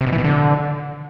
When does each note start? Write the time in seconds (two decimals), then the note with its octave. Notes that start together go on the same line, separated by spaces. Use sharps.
0.01 C3
0.07 B2
0.12 E3
0.18 B2
0.24 D3